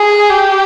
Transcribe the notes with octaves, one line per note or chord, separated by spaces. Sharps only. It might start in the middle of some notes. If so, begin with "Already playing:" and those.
Already playing: G#4
G4